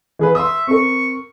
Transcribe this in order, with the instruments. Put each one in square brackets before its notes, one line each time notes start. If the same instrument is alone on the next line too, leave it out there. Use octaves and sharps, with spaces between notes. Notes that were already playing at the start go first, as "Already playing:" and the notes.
[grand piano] E3 G#4 B4
[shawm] E5 [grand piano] C6 D#6
[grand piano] C4 A#4 [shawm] C#6